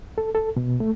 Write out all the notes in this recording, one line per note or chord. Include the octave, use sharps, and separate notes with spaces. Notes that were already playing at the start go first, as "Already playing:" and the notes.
A4
A4
B2
A3